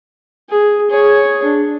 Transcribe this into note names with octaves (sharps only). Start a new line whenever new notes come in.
G#4
G#4 C#5
D4